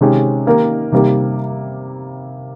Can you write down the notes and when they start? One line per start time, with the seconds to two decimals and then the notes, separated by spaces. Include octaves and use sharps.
0.01 C3 D#3 G#3 C#4 G4
0.47 D#3 A#3 D#4 G4 A#4
0.92 C3 D#3 G3 A#3